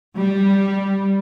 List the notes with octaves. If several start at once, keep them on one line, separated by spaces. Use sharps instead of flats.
G3